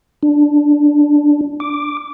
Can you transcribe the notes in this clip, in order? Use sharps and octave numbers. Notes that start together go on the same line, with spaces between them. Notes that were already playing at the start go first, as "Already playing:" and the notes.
D4
D6